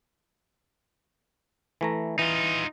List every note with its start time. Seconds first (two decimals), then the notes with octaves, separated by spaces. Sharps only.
1.81 E3 A3 A#5
2.19 E3 D#4 F4